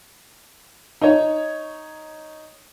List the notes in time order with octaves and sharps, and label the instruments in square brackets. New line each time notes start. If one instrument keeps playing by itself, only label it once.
[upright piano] D#4 C#5